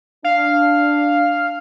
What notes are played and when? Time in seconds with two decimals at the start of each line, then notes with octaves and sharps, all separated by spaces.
0.24 D4 F5